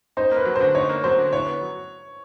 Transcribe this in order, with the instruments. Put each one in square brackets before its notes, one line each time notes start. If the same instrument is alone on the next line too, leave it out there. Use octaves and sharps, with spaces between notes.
[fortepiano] D#4 [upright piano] C5
[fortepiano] A#3 [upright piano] B4
[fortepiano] F#3
[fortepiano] D3 [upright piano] C5
[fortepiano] D#4 [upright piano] C#5
[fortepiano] A#3
[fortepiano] F#3 [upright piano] C5
[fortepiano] D3
[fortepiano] E4 [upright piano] C#5
[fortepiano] B3
F#3